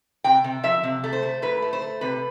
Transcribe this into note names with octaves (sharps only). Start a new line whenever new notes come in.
C3 G5
C3
F3 E5
C3
A3
C5
A3
A2 B4
A3
C5
A3
C3 B4